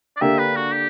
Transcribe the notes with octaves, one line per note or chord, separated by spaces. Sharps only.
D5
D3 A#3 D4 G4 E5
B4
F#4
G4